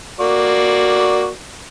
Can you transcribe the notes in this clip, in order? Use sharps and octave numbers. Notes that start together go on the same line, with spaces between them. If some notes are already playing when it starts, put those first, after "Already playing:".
A#3 F#4 D5